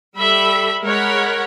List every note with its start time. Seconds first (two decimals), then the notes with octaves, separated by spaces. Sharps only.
0.18 G3 A4 E5 B5
0.82 G#3 A#4 C#5 F#5 B5